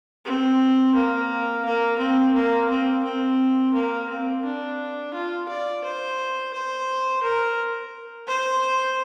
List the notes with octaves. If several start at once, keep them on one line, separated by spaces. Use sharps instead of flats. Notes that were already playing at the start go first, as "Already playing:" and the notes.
C4
A#3
A#3
C4
A#3
C4
C4
A#3
C4
D4
F4
D5
C5
C5
A#4
C5